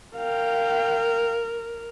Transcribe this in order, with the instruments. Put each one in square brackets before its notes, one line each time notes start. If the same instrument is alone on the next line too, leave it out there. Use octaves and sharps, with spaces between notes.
[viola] A#4 [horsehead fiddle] F5 G5